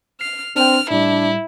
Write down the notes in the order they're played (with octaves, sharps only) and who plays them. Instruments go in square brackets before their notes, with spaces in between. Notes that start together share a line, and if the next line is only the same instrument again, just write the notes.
[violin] F6 [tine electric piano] C7
[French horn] C4 [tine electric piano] D4 G5 [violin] F6
[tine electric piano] A2 G3 [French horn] D4 [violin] E4